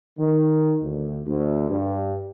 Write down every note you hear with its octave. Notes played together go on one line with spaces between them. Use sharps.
D#3
D2
D2
G2